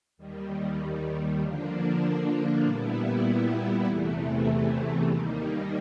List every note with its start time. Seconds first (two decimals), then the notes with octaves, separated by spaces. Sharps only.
0.18 D#2 D#3 G3
1.40 D3 F3 A#3 D4
2.61 A#2 G3 B3 E4
3.84 E2 C3 E3 A3
5.06 D#2 D#3 G3 A#3